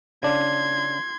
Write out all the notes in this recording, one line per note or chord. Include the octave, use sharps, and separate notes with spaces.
C#3 D4 C6 G#6